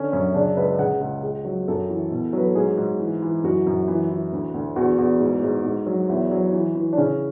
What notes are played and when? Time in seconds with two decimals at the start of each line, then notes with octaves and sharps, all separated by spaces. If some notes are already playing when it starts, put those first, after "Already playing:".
Already playing: D3 C#4
0.12 F#2 C#4
0.34 C#3 D4
0.57 C#2 B4
0.79 C#3 F#5
1.01 C#2
1.23 C#2
1.45 F#3
1.68 F#2 A4
1.89 E3
2.11 B2
2.33 F#3 B4
2.46 A4
2.55 G#2 G#4
2.77 G#2
2.99 E3
3.22 E3
3.43 F#2 F#4
3.66 F#2
3.88 E3
4.10 E3
4.32 D2
4.54 D2
4.76 E2 F#4
4.98 E2
5.20 G#2
5.43 G#2
5.65 G#2
5.86 F#3
6.09 E2 E4
6.31 F#3
6.53 E3
6.76 E3
6.93 D4
6.97 C#3 C#4